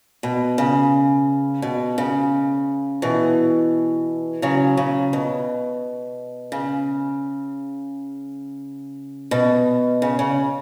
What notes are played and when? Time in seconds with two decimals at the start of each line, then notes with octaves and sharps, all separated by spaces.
0.23 B2
0.58 C#3
1.62 B2
1.98 C#3
3.02 B2 E3
4.42 C#3 F#3
4.77 C#3
5.13 B2
6.52 C#3
9.31 B2
10.02 C#3
10.19 C#3